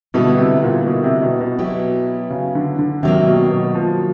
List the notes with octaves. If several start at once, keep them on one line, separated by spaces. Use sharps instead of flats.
B2 D3 G3 B3 E4 A4
C3
A#2
B2
C3
B2
B2
F#3 B3 E4 G4
C#3
D3
D3
C3 D#3 F#3 A#3
C3
B2
B2
F3